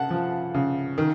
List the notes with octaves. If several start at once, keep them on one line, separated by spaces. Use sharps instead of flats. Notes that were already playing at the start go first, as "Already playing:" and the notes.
Already playing: C#3 F#5 A5
F3
C#3
D#3